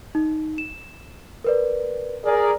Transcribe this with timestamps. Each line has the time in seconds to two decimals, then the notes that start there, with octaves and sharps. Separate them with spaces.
0.15 D#4
0.58 E7
1.44 A#4 B4 D5
2.25 G#4 A#4 D5